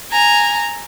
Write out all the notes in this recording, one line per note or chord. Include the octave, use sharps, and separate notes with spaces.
G#5 A#5